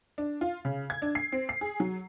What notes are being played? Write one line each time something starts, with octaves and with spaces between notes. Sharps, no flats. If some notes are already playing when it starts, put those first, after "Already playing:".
D4
F4
C#3
G#6
D4
C7
C4
C7
G#4
F#3